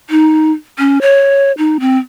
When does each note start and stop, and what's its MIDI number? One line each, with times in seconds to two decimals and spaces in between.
0.10 0.51 63
0.79 0.99 61
1.01 1.52 73
1.58 1.77 63
1.80 1.98 60